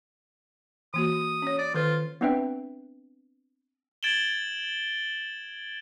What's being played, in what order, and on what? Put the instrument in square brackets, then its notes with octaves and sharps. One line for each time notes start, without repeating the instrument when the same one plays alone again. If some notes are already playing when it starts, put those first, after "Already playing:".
[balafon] E3 A#3 F#4 [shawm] D#6
[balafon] C#4 C#5
[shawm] D5
[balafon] D#3 A4 B4 [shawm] F4
[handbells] B3 C4 D4 B4 E5 G5
[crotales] G#6 A6 D7 E7 F#7 G7